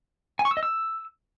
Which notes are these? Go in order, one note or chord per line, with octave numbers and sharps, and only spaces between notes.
G#5
C#6
E6
D#5
E6